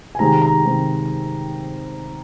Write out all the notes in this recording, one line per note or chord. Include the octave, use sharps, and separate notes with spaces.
G#5
C3 D#3 G#3 C4 A#5
A#5
C3 D#3 G#3 C4